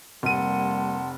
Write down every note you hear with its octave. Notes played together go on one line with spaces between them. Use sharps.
F1 G3 A#3 F#5 A5 C6 D#7